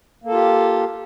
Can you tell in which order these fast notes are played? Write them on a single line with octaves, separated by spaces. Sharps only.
A#3 A4 F4 G4